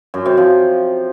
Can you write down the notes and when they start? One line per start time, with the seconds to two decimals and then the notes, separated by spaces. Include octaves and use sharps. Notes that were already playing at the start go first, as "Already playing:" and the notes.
0.14 F#2
0.26 C3
0.37 F3